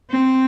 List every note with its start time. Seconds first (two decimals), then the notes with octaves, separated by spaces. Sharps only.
0.10 C4